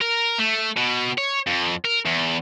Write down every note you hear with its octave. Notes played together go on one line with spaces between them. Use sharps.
A#4
A3
B2
C#5
F2
A#4
E2